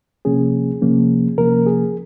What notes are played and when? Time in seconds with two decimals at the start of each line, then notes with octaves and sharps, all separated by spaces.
0.25 C3 F3 A#3 C#4 G#4
0.82 C3 F3 A#3 C#4
1.38 C3 F3 A#3 C#4 A#4
1.66 G#4